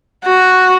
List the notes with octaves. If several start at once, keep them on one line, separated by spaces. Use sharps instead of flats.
F#4